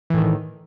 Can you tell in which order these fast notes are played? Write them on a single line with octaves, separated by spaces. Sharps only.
E3 A2 D#3